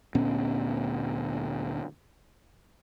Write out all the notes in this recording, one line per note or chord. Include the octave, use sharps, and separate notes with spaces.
D2 A#2 B3 C#4